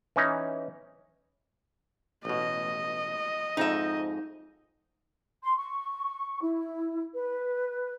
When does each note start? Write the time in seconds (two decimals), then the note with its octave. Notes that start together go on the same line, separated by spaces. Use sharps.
0.16 E3 C#4 D#4
2.25 A1 B2 D#5
3.57 F2 G#2 D#4 E5
5.42 C6
5.56 C#6
6.41 E4
7.15 B4